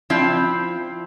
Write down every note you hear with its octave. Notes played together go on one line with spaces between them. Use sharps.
F3 C4 E4